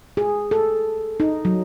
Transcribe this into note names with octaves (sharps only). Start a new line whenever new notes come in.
G#4
A4
D#4
F#3